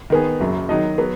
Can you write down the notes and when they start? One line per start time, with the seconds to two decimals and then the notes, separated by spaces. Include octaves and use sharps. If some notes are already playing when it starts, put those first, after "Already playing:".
0.10 D#3 B3 G#4
0.40 F#1 F#2 F#3
0.69 D#3 F#3 D#4 F#4 D#5
0.98 F#3 B3